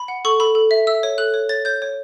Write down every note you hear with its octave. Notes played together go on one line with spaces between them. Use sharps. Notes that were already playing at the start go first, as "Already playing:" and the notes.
Already playing: B5
F#5
A4 C#6
A4 B5
A4
E5
E5 E6
C#5
A4 F#6
C#5
C#5 A6
C#5 G6
C#5